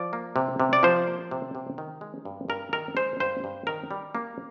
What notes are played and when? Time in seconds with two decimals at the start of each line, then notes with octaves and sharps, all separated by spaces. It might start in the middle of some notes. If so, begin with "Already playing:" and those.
Already playing: F3 D5
0.13 A#3
0.36 C3
0.60 C3
0.73 D5
0.83 F3 C5
1.07 A#3
1.31 C3
1.55 C3
1.78 D#3
2.01 G#3
2.25 G2
2.49 G2 A#4
2.73 D#3 A#4
2.97 G#3 C5
3.20 G2 C5
3.44 G2
3.67 D#3 A#4
3.91 G3
4.15 A#3